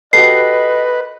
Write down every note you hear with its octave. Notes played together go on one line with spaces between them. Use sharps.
F#4 G4 A4 B4 D#5 C7